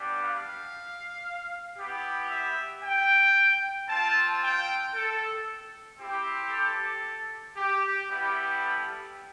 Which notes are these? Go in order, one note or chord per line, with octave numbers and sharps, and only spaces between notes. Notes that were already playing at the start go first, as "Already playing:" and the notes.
Already playing: G3 B3 D4 G4
F5
B3 E4 G4
E5
G5
C4 F4 A5
G5
A4
C4 E4 G4
A4
G4
G3 B3 E4 G4
A4